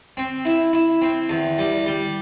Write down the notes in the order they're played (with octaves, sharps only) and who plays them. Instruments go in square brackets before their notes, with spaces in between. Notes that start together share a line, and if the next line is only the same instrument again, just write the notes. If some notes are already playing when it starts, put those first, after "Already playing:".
[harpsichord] C4
E4
E4
C4
E2
G3
G3